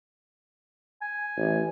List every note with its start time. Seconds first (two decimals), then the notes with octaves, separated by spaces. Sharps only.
1.02 G#5
1.37 A1